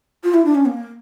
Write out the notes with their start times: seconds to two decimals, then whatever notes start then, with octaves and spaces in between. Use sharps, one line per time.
0.24 F4
0.34 E4
0.45 D4
0.55 C#4
0.66 A#3